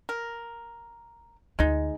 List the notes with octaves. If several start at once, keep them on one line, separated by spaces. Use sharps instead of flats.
A#4
D2 G#3 D#4 F4